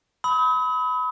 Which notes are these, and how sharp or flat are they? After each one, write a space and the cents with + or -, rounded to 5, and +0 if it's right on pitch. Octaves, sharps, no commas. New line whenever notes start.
B5 +15 D#6 +45